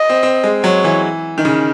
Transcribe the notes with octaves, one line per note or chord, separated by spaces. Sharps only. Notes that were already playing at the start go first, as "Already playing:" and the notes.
Already playing: D#5
C4
C4
G#3
F#3 C#5
E3
D#3
C#3